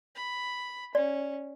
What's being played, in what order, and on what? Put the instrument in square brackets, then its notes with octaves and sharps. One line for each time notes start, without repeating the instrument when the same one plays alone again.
[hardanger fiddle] B5
[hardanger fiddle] C#4 [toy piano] D5